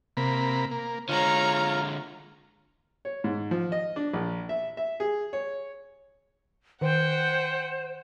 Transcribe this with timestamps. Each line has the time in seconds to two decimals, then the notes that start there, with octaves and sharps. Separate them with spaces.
0.17 C3 A#3 B5
0.71 A#3
1.09 D3 G#3 F4 C#5 A#5
3.05 C#5
3.24 G#2
3.51 F3
3.72 D#5
3.96 D4
4.13 A#1
4.49 E5
4.77 E5
5.00 G#4
5.33 C#5
6.81 D#3 C5 F#5 G5